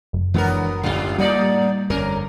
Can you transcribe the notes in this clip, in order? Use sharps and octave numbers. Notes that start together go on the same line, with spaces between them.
F#1
E3 F#3 G#3 B3 D4 A#4
A1 G#2 B2 D3 G3 F4
A2 G3 A#3 D#4 D5
G1 F2 D3 C#4 A#4